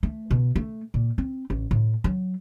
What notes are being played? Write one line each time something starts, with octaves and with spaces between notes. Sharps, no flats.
A3
B2
A3
A#2
C4
A1
A2
F#3